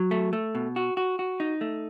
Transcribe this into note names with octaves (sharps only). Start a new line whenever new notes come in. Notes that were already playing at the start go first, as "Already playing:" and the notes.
Already playing: F#3
A3
A3
B2
F#4
F#4
F#4
D#4
A3